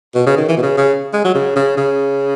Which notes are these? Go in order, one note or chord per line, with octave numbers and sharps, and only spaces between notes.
B2
C#3
D#3
E3
B2
C#3
C#3
G#3
F#3
C#3
C#3
C#3